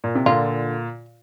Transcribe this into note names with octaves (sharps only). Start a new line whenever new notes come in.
A#2
C3
A#2 D3 F4